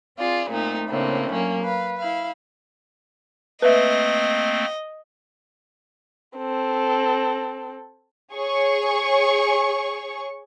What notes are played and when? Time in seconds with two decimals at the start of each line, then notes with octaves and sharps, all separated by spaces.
0.17 C4 F4 G#4 D5
0.49 A#2 A3 C4 D#4
0.88 A2 C#3 A#3 C4 D4
1.31 F#3 A#3 C#4
1.63 B4 F5
1.98 E4 F5
3.62 A3 A#3 C4 B4 D#5 E5
6.37 C4 A4
8.34 G#4 C#5 C#6